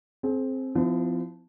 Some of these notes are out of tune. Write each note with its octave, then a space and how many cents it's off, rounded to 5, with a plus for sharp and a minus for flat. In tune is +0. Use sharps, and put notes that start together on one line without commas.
C4 +10 G#4 +40
F3 +0 C4 -45 E4 +0